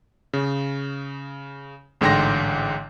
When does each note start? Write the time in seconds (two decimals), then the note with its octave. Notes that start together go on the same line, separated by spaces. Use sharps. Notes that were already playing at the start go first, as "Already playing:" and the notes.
0.33 C#3
2.01 A1 G#2 D3 G5 C6 A#6